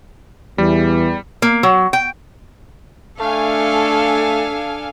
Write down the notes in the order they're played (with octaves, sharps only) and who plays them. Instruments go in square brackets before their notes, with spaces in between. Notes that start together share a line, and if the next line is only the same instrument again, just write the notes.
[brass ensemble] E2 [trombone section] E3 [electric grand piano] G3
[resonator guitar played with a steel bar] A#3
F#3
G5
[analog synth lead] A3 [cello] D4 A4 [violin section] F5 G#5